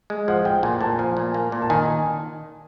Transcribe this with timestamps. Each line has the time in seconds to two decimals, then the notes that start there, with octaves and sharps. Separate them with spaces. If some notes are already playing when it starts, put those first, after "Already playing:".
0.10 G#3
0.28 F3 F#5
0.45 F3 G5
0.63 A#2 G#5
0.81 A#2 A5
0.99 F3 G#5
1.17 A#2
1.34 A#3
1.52 A#2
1.62 A5
1.70 D#3 G#5